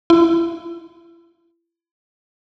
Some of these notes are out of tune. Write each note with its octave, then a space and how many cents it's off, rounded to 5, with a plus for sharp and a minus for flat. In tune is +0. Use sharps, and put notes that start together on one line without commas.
E4 +35